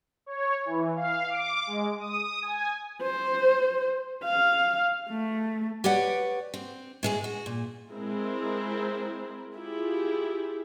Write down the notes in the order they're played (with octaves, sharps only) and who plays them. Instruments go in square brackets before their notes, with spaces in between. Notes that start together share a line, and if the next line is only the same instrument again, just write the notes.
[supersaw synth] C#5
E3
F5
D6
G#3
D#6
G#5
[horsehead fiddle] C5
F5
A3
[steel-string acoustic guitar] G4 B4 C#5 D5 F#5
C4
A2 G#3 G#4
F#4
A#2
[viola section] G#3 C4 E4 G#4 A#4
E4 F4 G4 G#4